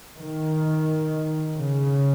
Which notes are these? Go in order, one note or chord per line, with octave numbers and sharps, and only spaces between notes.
D#3
C#3